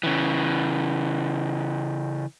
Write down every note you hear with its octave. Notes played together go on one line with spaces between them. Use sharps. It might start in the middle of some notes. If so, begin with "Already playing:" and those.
C#3 E3